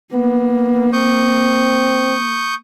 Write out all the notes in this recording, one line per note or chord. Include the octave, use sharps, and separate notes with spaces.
A#3 B3
C4 C#6 D#6 G6